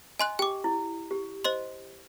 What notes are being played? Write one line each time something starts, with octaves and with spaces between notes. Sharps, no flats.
D#5 G#5 C6 F#6
G4 G5 D6
E4
G4
C5 D#5 C6